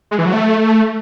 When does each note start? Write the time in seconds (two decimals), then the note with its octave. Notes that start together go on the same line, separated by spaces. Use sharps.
0.11 G#3
0.18 E3
0.26 F#3
0.33 A3